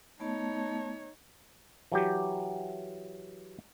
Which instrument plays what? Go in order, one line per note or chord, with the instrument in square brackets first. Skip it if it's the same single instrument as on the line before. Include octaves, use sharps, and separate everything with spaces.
[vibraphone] A3 B3 A5 [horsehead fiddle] D#4 C#5
[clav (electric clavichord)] E3 F#3 G4